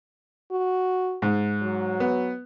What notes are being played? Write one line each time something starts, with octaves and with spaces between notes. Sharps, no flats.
F#4
G#2
F#3
B3